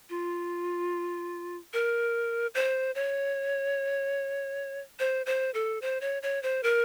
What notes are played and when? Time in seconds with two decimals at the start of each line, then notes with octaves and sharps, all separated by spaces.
0.10 F4
1.73 A#4
2.55 C5
2.95 C#5
4.99 C5
5.26 C5
5.54 A4
5.82 C5
6.01 C#5
6.23 C#5
6.43 C5
6.63 A#4